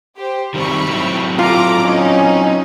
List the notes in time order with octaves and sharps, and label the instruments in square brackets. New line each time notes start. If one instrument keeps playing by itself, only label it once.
[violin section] G4 C5
[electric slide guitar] D#3 G3 C4 [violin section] B5 C#6
[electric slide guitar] F#3 C4 E4
[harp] F4 [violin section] A4 A#5 D6
[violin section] C#4 D#4